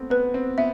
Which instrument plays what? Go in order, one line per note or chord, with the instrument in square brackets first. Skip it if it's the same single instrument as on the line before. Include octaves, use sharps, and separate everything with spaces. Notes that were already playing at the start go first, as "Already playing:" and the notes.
Already playing: [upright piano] A3 B3 C4
[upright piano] B3 [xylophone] B4
[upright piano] C4
[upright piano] B3 [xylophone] E5